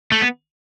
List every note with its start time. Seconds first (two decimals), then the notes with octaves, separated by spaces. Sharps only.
0.12 A3
0.22 B3